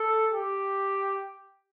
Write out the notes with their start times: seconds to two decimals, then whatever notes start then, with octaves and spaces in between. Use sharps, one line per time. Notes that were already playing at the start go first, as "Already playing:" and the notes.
Already playing: A4
0.32 G4